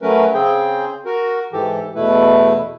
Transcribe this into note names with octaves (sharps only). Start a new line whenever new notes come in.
F#3 A3 C#4 A#4 B4
C#3 C4 G#4 G5
F#4 A#4
G#2 E3 G4 A4
E2 B2 A3 E4 B4